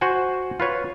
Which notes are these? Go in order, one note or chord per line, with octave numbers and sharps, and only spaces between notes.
F#4 C5 F#5 G#5
F4 B4 C#5